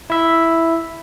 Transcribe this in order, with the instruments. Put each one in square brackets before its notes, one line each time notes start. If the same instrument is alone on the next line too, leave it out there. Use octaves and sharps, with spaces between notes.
[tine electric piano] E4 E5